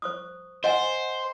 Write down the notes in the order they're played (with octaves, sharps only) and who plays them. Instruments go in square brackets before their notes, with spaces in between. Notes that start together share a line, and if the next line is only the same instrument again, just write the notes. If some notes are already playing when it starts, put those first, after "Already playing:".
[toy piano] C5 C#6 D#6
[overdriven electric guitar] C5 [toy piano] D#5 F#5 G#5